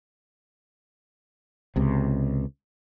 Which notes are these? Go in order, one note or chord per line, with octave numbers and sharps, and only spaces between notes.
C#2 C3